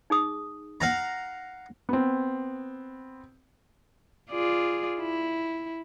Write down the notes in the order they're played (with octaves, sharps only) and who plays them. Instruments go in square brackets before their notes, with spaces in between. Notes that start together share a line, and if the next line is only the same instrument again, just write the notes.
[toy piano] D#4 G#4 D#6
[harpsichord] F5 F#5 A#5
[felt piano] B3 C4
[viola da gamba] F4 G#4 D5
E4